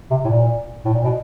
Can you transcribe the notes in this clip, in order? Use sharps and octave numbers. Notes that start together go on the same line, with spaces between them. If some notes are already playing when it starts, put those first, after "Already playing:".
C3
A2
A#2
A2
A#2
B2